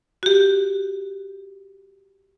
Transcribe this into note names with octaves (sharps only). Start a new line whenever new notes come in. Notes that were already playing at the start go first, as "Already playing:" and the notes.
F#4 G4